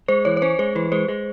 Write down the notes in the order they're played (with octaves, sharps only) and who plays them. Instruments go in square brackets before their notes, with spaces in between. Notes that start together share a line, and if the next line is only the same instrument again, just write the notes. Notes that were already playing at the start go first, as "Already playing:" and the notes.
[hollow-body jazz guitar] G#3 [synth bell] C5
[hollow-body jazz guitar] E3 [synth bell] C#5
[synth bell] C#5
[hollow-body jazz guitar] C#4 [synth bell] C5
[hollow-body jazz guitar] G#3 [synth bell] C5
[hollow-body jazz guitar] E3 [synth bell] B4
[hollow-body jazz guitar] G#3 [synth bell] C5
[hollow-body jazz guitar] G#3